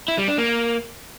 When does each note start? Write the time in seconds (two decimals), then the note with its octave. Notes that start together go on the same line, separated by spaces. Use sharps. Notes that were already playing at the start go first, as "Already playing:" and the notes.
0.08 E4
0.18 G3
0.28 D4
0.38 A#3